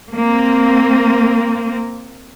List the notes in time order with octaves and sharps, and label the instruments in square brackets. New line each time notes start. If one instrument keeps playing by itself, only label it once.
[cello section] A#3 C4